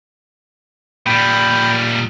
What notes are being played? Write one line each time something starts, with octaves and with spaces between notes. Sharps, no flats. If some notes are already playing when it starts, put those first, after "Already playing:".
A#2 G3 G5 B5